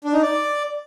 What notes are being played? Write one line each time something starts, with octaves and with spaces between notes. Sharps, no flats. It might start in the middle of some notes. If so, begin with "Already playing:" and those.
D4
D#4
D5